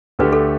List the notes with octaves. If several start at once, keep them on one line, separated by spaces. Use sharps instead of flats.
D2 D3 A3 G4 B4
A4